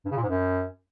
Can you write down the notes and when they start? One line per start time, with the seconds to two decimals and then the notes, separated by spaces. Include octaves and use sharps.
0.05 G2
0.11 C#3
0.17 A#2
0.23 G#2
0.29 F#2